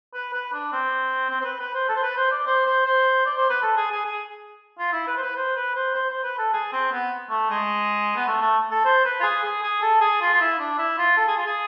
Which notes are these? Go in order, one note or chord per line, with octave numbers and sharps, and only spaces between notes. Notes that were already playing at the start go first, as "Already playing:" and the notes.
B4
B4
D4
C4
C4
C5
B4
B4
C5
A4
C5
B4
C5
D5
C5
C5
C5
D5
C5
B4
A4
G#4
G#4
G#4
F4
E4
B4
C5
B4
C5
B4
C5
C5
C5
B4
A4
G#4
C4
B3
A3
G#3
B3
A3
A3
A4
C5
B4
F4
G#4
G#4
G#4
A4
G#4
F4
F4
E4
D4
E4
F4
A4
G#4
F4
G#4